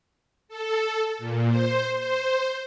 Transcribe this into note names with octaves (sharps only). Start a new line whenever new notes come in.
A4
A#2
C5
C5